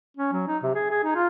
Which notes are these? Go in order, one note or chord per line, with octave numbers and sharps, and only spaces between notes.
C#4
F#3
D#4
C3
G#4
G#4
D#4
F4